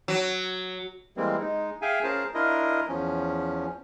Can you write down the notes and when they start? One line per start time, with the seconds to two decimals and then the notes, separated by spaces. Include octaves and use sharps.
0.08 F#3
1.17 E3 G3 G#3 A#3 C4
1.40 G#3 D#4
1.82 G#4 E5 F5 G5 G#5
2.04 C#4 F4 G#4 A#4 C5 A5
2.34 D4 E4 F4 A#4 D#5
2.89 E2 F3 C#4